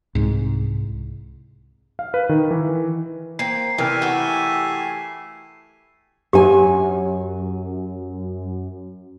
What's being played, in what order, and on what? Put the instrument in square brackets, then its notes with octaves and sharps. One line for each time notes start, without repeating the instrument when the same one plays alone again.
[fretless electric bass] C2 G#2
[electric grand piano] F5
B4
D#3
E3
[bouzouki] A#3 C4 [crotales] C7
[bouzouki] C3 D4 [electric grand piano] E3 A#4 F6 [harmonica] A3 E4 G#5
[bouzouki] F#4 G4
[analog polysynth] F#2 [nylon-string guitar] F#3 G#5 [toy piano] D4 G4